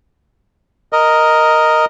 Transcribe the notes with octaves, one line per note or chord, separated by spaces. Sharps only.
A#4 D#5